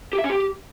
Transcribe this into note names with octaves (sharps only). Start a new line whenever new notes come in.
G4
E5
C#4
G4